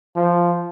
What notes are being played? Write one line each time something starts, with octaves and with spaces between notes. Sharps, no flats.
F3